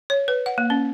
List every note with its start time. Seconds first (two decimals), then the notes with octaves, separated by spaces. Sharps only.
0.10 C#5
0.28 B4
0.46 F#5
0.58 A#3
0.70 C#4